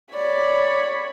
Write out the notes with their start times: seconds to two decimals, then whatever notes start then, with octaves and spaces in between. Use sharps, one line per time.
0.14 C#5 D5 B5